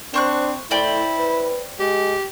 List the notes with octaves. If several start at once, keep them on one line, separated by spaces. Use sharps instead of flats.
C4 D4 C5 C#6 F#6
A2 E4 C5 D5 G5
B4
G#3 G4